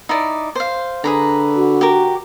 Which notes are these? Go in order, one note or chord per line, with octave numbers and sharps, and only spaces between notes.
D#4 E4 D5
C5 F5
D3 G#4 B4 A#5
F#4
G4 A#4